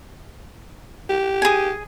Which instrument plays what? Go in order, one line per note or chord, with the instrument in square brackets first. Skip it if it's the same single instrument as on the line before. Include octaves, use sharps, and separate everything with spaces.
[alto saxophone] G4
[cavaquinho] G#4 G#5